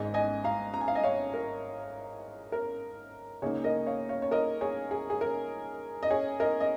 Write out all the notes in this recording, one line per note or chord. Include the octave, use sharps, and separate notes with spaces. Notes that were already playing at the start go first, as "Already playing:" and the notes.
Already playing: G#1 G#2 G#3 D#5 G#5
D#5 G#5
F5 A#5
A#5
G#5
F5
D#5 G#5
C#5 F5
A#4
A#4
C#2 C#3 A#3 D#4 G#4 C#5
A#4 D#5
C#5 F5
C#5 F5
C#5
A#4 D#5
G#4 C#5
G#4
G#4
A#4
D#5
G#4 C#5
A#4 D#5
D#5